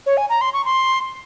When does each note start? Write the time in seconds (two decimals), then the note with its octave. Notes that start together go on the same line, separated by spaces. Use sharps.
0.06 C#5
0.17 G#5
0.30 A#5
0.41 C6
0.53 C#6
0.65 C6